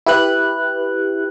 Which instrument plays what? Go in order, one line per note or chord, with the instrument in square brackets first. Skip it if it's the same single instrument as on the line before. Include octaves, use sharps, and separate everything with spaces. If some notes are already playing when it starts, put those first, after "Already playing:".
[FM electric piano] E4 G4 B4 F#6